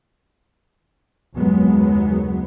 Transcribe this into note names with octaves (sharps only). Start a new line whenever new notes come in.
F#1 D#2 F#3 G#3 B3